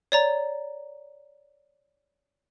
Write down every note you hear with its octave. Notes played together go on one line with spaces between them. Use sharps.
C#5 D5 A#5